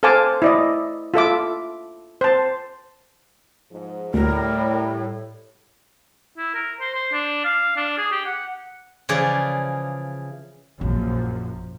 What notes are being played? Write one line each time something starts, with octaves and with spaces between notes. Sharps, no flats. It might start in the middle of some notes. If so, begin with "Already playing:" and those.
A4 C5 F5 G#5 A5 D6
E4 D5 D#5
F4 A4 E5 D6
C5 A5
G#2 F3
D2 A2 G3 A#4
E4
A#4
C5
C5
D4
F5
D4
G#4
G4
F#5
C#3 E3 F3 G#4 D5
A#1 F#2 A#2 F3